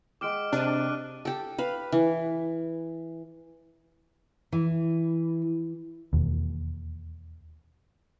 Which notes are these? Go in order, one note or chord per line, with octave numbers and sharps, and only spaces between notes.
G#3 F#5 G5 D6 F6 D7
C3 D4 F#6 D#7
G4 A4
B4 F5
E3
E3
E1 D#2